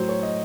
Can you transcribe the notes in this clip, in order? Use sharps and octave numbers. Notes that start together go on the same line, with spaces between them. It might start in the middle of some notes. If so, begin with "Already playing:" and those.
Already playing: A2 F#3 C5
C#5
D#5